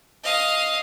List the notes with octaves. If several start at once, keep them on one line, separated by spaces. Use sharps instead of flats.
D#5 F5